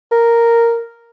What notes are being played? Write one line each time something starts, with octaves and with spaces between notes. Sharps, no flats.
A#4